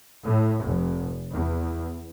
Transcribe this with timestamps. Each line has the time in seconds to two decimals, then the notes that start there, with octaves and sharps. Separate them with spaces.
0.25 A2
0.66 F1
1.30 E2